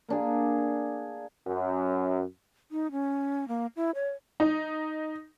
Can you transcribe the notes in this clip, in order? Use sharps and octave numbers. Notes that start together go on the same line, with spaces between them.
A#3 D4 G#4
F#2
D#4
C#4
A#3
E4
C#5
D#4